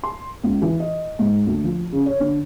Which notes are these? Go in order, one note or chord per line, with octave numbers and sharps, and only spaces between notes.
C6
C#2
E3
D#5
G#2
D2
F3
C#3
C#5
D3